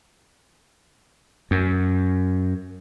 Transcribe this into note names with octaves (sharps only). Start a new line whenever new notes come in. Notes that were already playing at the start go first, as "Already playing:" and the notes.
F#2